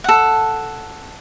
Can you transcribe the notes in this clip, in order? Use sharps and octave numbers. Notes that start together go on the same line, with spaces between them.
A4 F#5